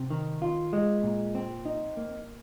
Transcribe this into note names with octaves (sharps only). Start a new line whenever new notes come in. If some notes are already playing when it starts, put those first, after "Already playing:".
Already playing: C3
D#3
F4
G#3
A#2
C4
D#4
A#3